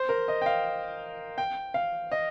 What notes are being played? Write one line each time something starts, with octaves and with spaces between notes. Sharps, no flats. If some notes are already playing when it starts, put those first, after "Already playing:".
Already playing: C5
A#4
D#5
G5
F5
G5
F5
D#5